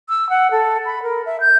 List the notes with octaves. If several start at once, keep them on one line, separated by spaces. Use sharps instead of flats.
E6
F#5
A4
B5
A#4
E5
G6